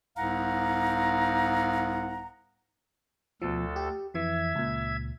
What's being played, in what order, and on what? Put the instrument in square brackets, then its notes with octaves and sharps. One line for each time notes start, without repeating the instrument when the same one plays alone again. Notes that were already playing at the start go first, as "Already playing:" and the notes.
[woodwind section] C2 G#2 B3 F5 F#5 A#5
[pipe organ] D2 A4 [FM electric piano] B2 F3
[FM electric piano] G4
[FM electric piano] F2 E3 [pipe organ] E5 G#6
[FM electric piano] C#2 A#2